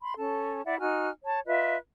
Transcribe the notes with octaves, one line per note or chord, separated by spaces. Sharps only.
B5 C6
C#4 A4 A5
E4 D5 E5 F#5
D#4 F#4 G#5 F6
C#5 A5
F4 B4 D#5 E5